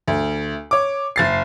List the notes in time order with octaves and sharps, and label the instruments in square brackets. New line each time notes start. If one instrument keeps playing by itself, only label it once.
[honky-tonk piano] D2
C#5 D6
F#1 A6 C7